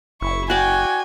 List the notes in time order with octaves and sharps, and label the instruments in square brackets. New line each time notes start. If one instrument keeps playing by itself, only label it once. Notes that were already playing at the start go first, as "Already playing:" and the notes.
[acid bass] F#1 [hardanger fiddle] E4 C#6
[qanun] F#4 D5 [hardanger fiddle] G5 [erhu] G#5